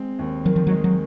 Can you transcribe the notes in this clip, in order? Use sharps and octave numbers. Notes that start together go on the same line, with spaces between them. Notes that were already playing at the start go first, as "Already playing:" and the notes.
Already playing: G#3 C4
D#2
D#3 F#3
F3
F#3
G#3
F#3